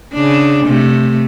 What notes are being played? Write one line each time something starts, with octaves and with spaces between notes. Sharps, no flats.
C#3 D4
C3 A3